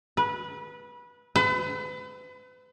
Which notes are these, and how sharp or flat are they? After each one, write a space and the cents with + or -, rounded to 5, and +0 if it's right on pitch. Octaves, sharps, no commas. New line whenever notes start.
B4 -20
B4 +40